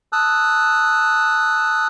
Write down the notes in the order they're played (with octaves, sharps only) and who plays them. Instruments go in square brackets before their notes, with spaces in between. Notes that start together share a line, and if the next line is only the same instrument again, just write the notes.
[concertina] A5 D#6 E6 F#6